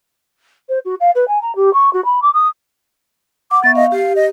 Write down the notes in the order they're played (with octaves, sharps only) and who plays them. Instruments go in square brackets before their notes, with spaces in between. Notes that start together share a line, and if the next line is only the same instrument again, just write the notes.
[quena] C5
F#4
F5
B4
G#5
A#5
G4
C#6
F#4
B5
D6
D#6
[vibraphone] F#5 [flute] D6
[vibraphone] B3 E5 C#6 [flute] A6
[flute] D#5 [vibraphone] F5
[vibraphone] G4 [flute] F5
[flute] D#5